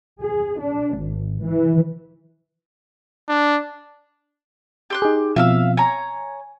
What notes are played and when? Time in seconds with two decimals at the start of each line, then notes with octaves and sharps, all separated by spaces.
0.21 G#4
0.61 D4
0.98 G#1
1.43 E3
3.29 D4
4.90 G4 C6 F#6
5.02 D#4 G#4
5.36 B2 F3 C4 E5 F5 E6
5.77 C#5 G#5 A#5